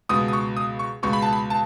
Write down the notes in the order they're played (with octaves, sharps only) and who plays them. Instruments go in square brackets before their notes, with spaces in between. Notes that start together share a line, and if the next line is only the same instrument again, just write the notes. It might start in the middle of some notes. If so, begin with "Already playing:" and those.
[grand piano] C#2 B2 D#6
D#6
C#6
D#6
C#6
C#2 B2 C#6
B5
A5
B5
A5